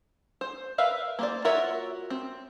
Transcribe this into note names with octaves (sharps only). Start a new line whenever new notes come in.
C5
A#4 B4 E5 F5
A#3 C5 D5
F4 F#4 A#4 C#5 E5
C4